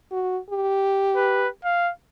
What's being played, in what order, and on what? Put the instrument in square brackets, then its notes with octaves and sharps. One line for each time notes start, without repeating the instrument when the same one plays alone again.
[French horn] F#4
G4
[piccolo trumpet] B4
F5